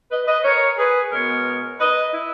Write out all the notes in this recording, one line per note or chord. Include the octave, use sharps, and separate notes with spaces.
B4 D#5
B4 D#5
A#4 C#5
G#4 B4
B2 G#3 B3 A#4 C#5
B4 D#5
E4